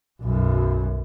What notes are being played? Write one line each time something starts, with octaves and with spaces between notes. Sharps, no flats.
B1 F#2